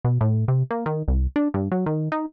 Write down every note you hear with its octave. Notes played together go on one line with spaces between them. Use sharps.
B2
A2
C3
A#3
D#3
C2
D4
G2
F#3
D#3
D#4